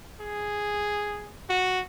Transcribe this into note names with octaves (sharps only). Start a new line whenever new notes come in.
G#4
F#4